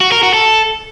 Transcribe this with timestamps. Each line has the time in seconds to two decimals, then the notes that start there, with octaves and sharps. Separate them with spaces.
0.01 F#4
0.12 A#4
0.23 F#4
0.34 A4